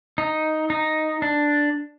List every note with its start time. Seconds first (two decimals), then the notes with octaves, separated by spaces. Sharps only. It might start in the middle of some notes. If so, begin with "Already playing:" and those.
0.18 D#4
0.70 D#4
1.22 D4